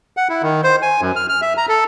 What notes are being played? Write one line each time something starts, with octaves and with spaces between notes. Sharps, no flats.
F#5
E4
D#3
C5
G#5
F#2
F6
F6
E5
A#5
A4